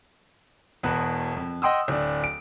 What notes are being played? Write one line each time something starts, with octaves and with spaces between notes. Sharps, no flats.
E1 E2 B2 B4 F#6
F2
D#5 F#5 G5 C6 D#6 E6
D1 D4
D7